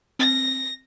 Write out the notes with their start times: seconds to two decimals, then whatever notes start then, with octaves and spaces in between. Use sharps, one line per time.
0.19 C4 A#6